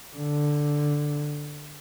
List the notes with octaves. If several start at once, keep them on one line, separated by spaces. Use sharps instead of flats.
D3